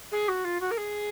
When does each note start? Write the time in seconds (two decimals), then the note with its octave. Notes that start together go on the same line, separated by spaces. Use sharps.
0.12 G#4
0.28 F#4
0.44 F4
0.60 F#4
0.71 A#4
0.77 G#4